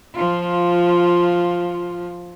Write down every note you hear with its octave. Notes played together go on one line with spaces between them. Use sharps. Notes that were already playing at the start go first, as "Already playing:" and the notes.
F3 F4